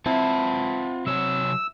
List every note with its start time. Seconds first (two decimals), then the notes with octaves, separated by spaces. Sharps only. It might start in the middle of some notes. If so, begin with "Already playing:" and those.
0.06 C4 E4 F4 F#5 A5
1.07 C3 F#3 C#5 E6